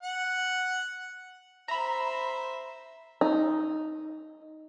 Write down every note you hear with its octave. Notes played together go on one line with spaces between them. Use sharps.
F#5
C5 E5 A#5 B5
D#4